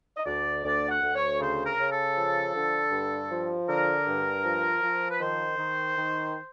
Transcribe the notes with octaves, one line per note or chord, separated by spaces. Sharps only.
D#5
D2 D5
D2 D5
F#5
D2
C#5
C#3 C5
A#4
C#3
A4
F3
D3
G2
F3
D3 A#4
G2
F3
F3
B4
D#3 C5
D#3
D#3